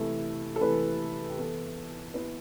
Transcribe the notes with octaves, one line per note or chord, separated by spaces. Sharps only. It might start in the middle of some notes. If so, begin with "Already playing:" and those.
Already playing: C3 E3 A3 E4 A4
A4
C3 E3 A3 E4 B4
G4
E3 B3 E4 A4
E3 B3 E4 B4